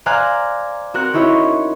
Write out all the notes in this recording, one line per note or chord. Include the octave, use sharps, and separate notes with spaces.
C5 D5 F5 G#5 A#5 F#6
C4 F#4 A#4 F#6 A#6
C#4 D#4 E4 F#4 C5 C#5